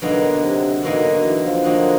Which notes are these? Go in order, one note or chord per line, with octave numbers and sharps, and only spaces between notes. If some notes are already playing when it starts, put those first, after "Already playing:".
B2 D3 F#3 A#3 D#4 F#4
C3
B2 D3 F#3 A#3 D#4 F#4
E3
F3
D3 F#3 A#3 D#4 F#4